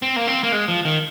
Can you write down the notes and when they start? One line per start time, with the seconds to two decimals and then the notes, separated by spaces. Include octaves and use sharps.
0.02 C4
0.16 A#3
0.28 C4
0.43 A#3
0.52 G#3
0.68 F3
0.85 D#3